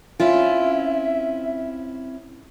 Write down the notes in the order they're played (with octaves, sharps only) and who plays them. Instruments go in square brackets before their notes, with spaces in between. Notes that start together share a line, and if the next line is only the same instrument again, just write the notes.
[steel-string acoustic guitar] C4 C#4 E4 [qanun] F4 [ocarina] E5